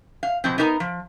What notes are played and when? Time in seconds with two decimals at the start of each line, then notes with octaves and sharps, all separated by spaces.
0.23 F5
0.44 B2 F3 C4
0.58 B3 D#4 A#4 A5 A#5
0.80 F3